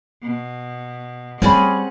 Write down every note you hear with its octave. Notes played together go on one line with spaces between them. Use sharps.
B2
G3 C4 C#4 G#4 C#5 D5 F#5 B5